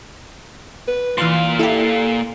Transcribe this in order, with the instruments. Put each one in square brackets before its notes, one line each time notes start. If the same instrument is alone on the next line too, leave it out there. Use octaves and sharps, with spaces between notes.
[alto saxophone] B4
[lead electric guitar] A#2 F5 [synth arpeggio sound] E3 C6 [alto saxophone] F4
[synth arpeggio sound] E4 G4 [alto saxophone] A4